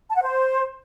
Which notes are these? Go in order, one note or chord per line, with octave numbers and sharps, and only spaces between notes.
A5
F#5
C5